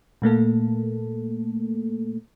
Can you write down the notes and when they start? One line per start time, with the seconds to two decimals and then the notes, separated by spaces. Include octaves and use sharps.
0.22 A#2 A3 A#3 A4